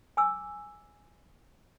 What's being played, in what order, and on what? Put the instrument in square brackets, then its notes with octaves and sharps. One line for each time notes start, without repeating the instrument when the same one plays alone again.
[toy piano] G#5 D6 E6